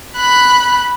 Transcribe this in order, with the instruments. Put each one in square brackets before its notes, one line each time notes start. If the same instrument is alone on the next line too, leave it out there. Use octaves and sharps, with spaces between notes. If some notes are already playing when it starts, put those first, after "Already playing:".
[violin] B5 F#6